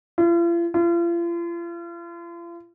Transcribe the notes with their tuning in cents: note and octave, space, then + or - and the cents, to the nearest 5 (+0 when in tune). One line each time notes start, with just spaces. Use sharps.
F4 -45
F4 -40